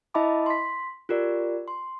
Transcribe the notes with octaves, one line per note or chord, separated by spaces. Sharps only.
E4 D#5 E5 A5 B5 D6
C6 B6
F4 G4 A#4 D5
C6